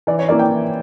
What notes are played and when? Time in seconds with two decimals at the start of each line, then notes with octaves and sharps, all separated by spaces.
0.07 E3 D5
0.19 C#5
0.29 A#3 E4 D5
0.39 G5
0.51 E3